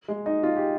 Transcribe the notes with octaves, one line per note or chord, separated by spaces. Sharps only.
G#3
D#4
F4
G4